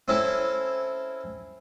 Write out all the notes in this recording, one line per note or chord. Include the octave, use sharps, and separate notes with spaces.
C4 C#4 E4 A4